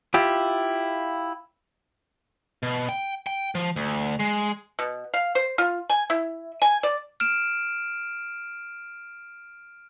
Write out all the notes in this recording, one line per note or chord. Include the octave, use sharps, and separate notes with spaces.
E4 F4 G4
B2
G5
G5
F3
D2
G#3
B2
F5
C5
F4
G#5
E4
G#5
D5
F6 D7 E7